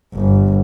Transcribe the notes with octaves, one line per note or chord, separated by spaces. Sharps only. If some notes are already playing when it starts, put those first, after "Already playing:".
G1